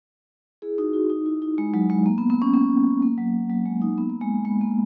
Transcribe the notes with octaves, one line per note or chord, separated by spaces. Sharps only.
E4 G#4
D#4 F#4
D#4 F#4
D#4
E4
D#4
G#3
F#3
G#3
A#3
B3
B3
C#4
B3
A#3
F#3
F#3
G#3
D#4
B3
A#3
G#3
G#3
A#3